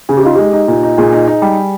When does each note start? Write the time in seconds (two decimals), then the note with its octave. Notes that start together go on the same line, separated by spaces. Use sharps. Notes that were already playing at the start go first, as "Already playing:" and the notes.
0.09 C#3 G#4
0.17 G4
0.23 D#4 F4
0.35 G#3 G4
0.53 D#4
0.68 A#2
0.83 D#4
0.98 A#2 G#4
1.13 D#4
1.27 D#4
1.42 G3